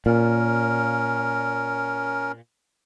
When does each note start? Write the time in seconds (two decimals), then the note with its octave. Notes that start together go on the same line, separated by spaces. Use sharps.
0.06 A#2 C#4 A#4